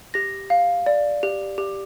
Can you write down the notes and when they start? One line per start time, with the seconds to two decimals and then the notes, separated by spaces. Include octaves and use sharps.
0.14 G4 A#6
0.50 F5
0.86 D5
1.23 G4
1.58 G4